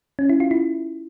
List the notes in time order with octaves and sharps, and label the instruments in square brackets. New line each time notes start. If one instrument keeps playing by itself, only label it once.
[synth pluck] C#4
E4
F4
E4